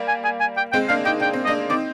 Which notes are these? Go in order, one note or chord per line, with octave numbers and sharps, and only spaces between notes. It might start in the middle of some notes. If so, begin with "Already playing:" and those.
Already playing: G3 A#3
G#5
G#5
G#5
G5
G#3 C4 G5
A#3 D4 F5
D#4 G5
D4 G5
C4
A#3 D4 D#5
C4 D#4 D5